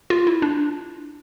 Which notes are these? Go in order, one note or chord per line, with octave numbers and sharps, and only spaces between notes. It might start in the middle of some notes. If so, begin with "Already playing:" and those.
F4
E4
D4